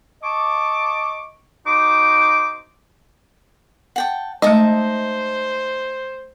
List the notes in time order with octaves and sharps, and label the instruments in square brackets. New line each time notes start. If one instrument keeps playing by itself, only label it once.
[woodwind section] D#5 A5 C#6 D6
D#4 F#4 C5 D6
[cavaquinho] F#5 G5 A5
[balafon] G#3 A3 [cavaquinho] D#4 E5 A5 [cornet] C5 [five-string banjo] D#5